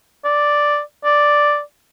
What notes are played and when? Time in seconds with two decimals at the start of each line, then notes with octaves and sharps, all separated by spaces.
0.25 D5
1.05 D5